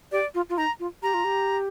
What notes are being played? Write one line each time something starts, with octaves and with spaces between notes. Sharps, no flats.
G4 D5
F4
F4
D#4 A#5
F4
G4 A#5
F4
G4